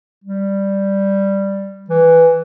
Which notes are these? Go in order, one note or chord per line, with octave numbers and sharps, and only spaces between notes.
G3
E3